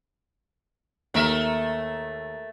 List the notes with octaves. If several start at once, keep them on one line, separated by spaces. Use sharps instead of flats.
D#2 A3 A#4 E5